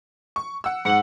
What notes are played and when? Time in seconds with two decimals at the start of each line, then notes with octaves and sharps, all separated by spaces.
0.36 C#6
0.64 F#5 E6
0.85 G#2 F#5 F#7